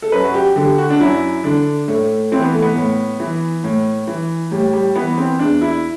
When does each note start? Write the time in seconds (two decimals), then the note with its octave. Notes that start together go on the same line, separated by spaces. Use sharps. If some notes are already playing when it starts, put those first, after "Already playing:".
0.02 A4
0.12 F#2 B4
0.24 F#4
0.34 G4
0.56 D3 G4
0.78 F#4
0.90 D4
1.00 F#2 E4
1.44 D3 D4
1.88 A2 A3
2.32 E3 C4
2.42 B3
2.53 A3
2.62 B3
2.76 A2
3.20 E3
3.64 A2
4.07 E3
4.51 A2 G3
4.73 G3
4.95 E3 B3
5.18 C4
5.39 E2 D4
5.61 E4